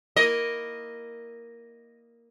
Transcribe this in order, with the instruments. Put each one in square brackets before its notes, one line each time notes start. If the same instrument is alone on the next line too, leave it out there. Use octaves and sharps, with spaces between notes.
[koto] A#3 E4 A#4 [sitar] D#5